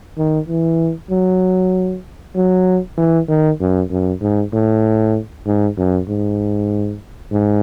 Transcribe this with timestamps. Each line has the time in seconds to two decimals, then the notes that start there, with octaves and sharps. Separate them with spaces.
0.18 D#3
0.49 E3
1.11 F#3
2.35 F#3
2.97 E3
3.29 D#3
3.60 F#2
3.91 F#2
4.21 G#2
4.53 A2
5.46 G#2
5.77 F#2
6.09 G#2
7.32 G#2